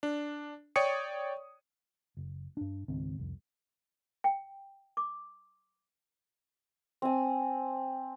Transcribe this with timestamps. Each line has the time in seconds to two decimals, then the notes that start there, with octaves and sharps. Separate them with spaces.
0.03 D4
0.76 C#5 D5 G5 C#6 D#6 C#7
2.17 F#1
2.57 G2 D4
2.88 C#2 G#2 D#3 C4
3.18 C2 F2
4.24 G5
4.97 D6
7.02 C4 G#5